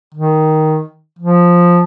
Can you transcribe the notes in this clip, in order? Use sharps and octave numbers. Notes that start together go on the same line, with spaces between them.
D#3
F3